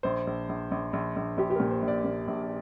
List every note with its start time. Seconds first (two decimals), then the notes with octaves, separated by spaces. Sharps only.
0.03 A#1 C5
0.27 A#1
0.49 A#1
0.71 A#1
0.93 A#1
1.16 A#1
1.37 A#1 G4
1.50 G4
1.55 A#2 A#4
1.71 C5
1.82 A#1
1.88 D5
2.05 A#2
2.28 A#1